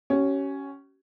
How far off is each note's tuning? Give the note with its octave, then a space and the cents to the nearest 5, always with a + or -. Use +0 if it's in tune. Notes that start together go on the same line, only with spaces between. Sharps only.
C#4 +0 G4 -45